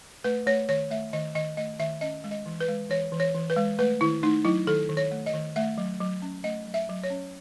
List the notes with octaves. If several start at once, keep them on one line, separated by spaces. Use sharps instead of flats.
A3 B4
A3 C#5
D#3 C#5
A3 E5
D#3 D#5
D#3 D#5
A3 D#5
D#3 E5
C#4 D#5
G#3
D#5
E3
B4
G#3
E3 C#5
E3
C#5
E3
B4
G#3
A3 B4
D#3 E4
A3 D#4
F#3 E4
D#3 A4
D#3
C#5
A3
D#5
D#3
A3 E5
F#3
F#3
C#4
A3 D#5
F#3
E5
F#3
C#5
C#4